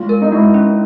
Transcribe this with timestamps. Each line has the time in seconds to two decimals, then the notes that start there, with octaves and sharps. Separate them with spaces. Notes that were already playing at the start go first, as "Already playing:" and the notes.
Already playing: G#3 F4
0.09 A#4
0.22 D#4
0.32 G#3 E4
0.54 C#4